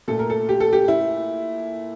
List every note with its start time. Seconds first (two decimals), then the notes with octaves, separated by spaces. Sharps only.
0.08 A#2 A3 A4
0.19 A#4
0.30 A4
0.49 G4
0.60 A4
0.73 G4
0.88 E4